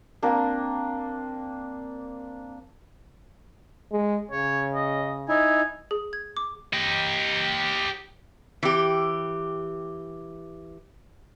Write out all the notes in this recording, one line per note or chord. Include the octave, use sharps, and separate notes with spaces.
A#3 C4 D4
G#3
C#3 C#5
D#5
D#4 E4 G#5
G#4
G#6
D6
G4 D#5
E3 G4